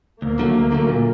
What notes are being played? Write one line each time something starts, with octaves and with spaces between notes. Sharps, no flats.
D2 A#3
D3 F#3 A3
D2
D3 F#3 A3
A#2